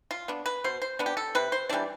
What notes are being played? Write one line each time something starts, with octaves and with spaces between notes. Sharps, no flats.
F4
B3 D4
B4
B2 C5
C5
B3 D4
G4
A4
C3 B4
C5
E3 G3 D4 D5